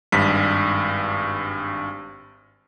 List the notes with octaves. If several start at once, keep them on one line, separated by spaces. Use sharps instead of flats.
G#1 G2 B6